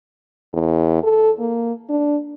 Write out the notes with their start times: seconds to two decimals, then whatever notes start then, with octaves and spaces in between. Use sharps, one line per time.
0.53 E2
1.04 A4
1.39 A#3
1.89 D4